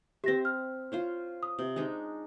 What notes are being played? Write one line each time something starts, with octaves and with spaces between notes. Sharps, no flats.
C4 G4 E5 A#6
F6
F4 C5 C#5
D#6
C3
G#3 D4 D#4